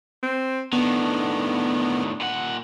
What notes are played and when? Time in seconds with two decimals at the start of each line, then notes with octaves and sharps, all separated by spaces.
0.23 C4
0.73 A2 D#3 B3 D4
2.21 A#2 F#5